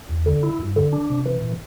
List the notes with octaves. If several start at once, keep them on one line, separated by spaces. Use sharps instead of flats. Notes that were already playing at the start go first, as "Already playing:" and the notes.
E2
D3
E4
G2
D3
D4
C3
E3
A#2